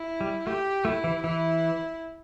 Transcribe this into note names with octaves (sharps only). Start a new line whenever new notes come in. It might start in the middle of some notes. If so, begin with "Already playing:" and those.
Already playing: E4
G3
A3 G4
A3 E4
E3
E3 E4